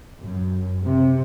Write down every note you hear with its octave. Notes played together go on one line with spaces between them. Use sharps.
F#2
C3